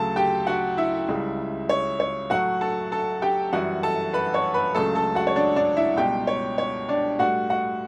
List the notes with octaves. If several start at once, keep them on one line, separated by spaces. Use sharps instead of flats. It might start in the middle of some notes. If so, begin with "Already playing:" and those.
Already playing: D2 C#3 F#3 A4 A5
G4 G5
F#4 F#5
E4 E5
C#2 C#3 G3
C#5
C#5
A2 F#3 A3 F#4 F#5
A4 A5
A4 A5
G4 G5
F#2 E3 G3 F#4 F#5
A4 A5
B4 B5
C#5 C#6
B4 B5
C#2 C#3 F#3 A3 A4 A5
A4 A5
F#4 F#5
C#5
D4 D5
D4 D5
E4 E5
C#2 B2 G3 G4 G5
C#5
C#5
D4 D5
A2 G3 F#4 F#5
F#4 F#5